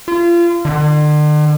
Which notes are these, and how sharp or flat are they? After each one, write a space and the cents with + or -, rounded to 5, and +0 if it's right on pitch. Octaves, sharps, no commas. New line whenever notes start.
F4 -30
D3 +40